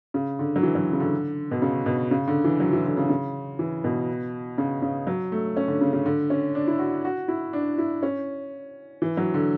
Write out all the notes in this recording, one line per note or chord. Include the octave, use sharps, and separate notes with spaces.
C#3
D3
F#3
E3
F#3
C#3
D3
B2
C#3
B2
C#3
D3
E3
F#3
E3
D3
C#3
C#3
E3
B2
C#3
C#3
F#3
A3
C#4
D3
C#3
C#3
D3
C#4
D4
E4
F#4
F#4
E4
D4
E4
C#4
E3
F#3
D3